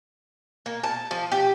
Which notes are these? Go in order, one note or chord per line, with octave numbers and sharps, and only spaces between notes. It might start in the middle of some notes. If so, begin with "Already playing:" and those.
A#3
A5
F3
G4